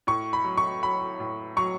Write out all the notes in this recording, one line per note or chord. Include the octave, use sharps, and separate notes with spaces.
A2 C#6
B5
F#3
C#6
F#3 B5
A2
F#3 C#6